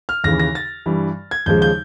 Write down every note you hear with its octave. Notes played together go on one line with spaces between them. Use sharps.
F6
D#2 C#3 E3 A#6
A#6
A6
G2 E3 G3
G#6
D#2 C#3 F3 G#3 G6
G6